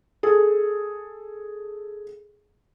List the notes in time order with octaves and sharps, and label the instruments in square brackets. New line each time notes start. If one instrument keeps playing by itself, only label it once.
[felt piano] G#4 A4